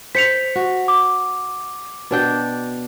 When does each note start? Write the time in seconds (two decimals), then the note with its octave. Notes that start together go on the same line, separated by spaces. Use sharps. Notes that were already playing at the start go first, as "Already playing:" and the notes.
0.15 C5 B6 C#7 F7
0.55 F#4
0.88 D6
2.11 B2 D4 G5